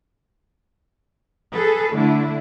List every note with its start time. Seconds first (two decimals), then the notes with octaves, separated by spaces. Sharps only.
1.54 G#4 A4 B4
1.94 D3 A3 D4 E4